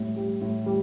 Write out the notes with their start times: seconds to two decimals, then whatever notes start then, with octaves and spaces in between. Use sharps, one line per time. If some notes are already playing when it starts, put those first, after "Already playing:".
Already playing: A2 G3
0.16 G3
0.41 A2
0.66 G3